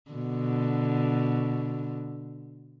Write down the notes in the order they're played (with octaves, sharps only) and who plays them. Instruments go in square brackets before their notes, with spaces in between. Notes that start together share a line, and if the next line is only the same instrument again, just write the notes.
[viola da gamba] B2 D3